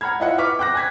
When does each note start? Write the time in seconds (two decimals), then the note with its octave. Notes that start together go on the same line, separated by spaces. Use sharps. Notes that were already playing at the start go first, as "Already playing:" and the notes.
0.01 F#5 A#5 B5 F6 G#6
0.20 E4 F4 C#5 D#5 E5 F#5
0.38 B4 F#5 C#6 D6 F6 B6
0.59 G5 D6 F#6 A#6
0.74 G#5 F#6 G#6 B6